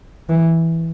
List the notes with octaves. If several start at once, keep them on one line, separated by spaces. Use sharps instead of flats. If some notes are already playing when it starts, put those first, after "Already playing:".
E3